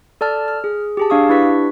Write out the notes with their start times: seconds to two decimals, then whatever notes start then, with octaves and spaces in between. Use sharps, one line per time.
0.21 A4 D5 A5 F6
0.48 F6
0.64 G#4
0.97 G4 G#4 A5
1.10 D4 F5 C#6 D#6
1.29 D4 E4 G4 B4 C#6 B6